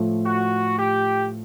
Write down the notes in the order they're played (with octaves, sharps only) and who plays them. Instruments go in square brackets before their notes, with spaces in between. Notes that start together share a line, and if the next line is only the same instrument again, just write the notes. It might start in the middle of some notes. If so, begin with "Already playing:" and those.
Already playing: [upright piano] A2 F3 A3
[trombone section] F#4
G4